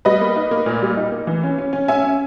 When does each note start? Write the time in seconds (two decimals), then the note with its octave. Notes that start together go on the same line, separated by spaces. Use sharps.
0.05 G3 B4 D#5
0.21 A#3
0.36 D#4
0.51 A#3
0.66 A#2
0.82 G3
0.97 D#4
1.12 A#3
1.27 E3
1.43 C#4
1.58 C#4
1.73 C#4
1.88 C#4 E5 G#5
2.04 C#4